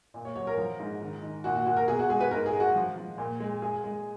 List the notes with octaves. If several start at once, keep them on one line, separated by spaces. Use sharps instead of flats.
A#2
C#5
F#3 C#5
A#4
F3
G#2
D#3
D#3
A#2 F#4
F#4
A#2 F#4
A#4
B2 G#4
F#4
G#3 G#4
B4
G#2 A#4
G#4
G#3
F#4
F3
F3
A#2
G#3
G#3 G#4
G#3